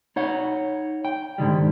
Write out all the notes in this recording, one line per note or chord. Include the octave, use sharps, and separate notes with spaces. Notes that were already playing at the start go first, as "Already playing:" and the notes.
D#4 C#5 F#5
G5
G#2 D3 D#3 G3